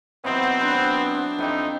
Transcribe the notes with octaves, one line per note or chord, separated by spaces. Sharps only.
F#3 B3 C4 D#4 E4
D4 B4
F2 C4 D#4 E4 G4